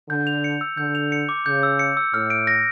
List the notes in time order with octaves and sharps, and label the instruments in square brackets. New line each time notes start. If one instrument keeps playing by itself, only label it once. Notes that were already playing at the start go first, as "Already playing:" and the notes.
[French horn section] D3 [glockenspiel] G6
[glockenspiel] F7
C#7
E6
[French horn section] D3 [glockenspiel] G6
[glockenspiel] F7
C#7
D6
[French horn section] C#3 [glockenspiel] G6
[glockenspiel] E6
C#7
E6
[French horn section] A2 [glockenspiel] F6
[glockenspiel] D7
A#6